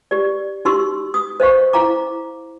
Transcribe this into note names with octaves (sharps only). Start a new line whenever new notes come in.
G4 D5
D#4 F#4 G4 C6 C#6 E6
D#6
C5 D#5 F5 C#6
E4 F5 A#5 D6